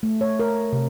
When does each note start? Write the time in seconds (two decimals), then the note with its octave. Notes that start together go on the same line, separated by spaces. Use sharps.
0.03 A3
0.21 C#5
0.40 A#4
0.73 C3